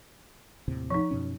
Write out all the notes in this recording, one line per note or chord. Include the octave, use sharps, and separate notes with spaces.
D#2 A2 C3
F3 D#4
F#2 B2 C#4